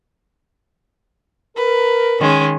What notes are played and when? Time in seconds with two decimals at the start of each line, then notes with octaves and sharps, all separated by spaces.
1.56 A#4 B4
2.21 D#3 G#3 C#4